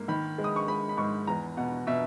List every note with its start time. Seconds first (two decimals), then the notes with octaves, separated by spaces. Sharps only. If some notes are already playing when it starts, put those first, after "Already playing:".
Already playing: G#2 A#3
0.08 D#3 B5
0.38 G#3
0.44 D#6
0.56 C#6
0.68 G#3 B5
0.89 B5
0.97 G#2 C#6
1.27 E2 A#5
1.57 B2 F#5
1.87 B2 E5